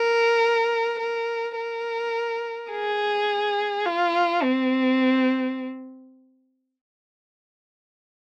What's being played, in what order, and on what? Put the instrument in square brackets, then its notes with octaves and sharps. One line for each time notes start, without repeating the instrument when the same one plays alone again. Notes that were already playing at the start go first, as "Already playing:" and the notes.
Already playing: [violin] A#4
A#4
A#4
G#4
F4
C4